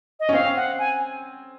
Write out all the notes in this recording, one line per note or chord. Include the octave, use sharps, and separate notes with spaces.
D#5
C#4
C4 F5
F#5
G#5